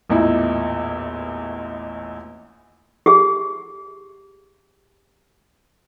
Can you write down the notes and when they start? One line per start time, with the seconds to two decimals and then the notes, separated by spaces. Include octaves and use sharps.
0.09 A1 E2 A#2 D#4 E4
3.06 G4 G#4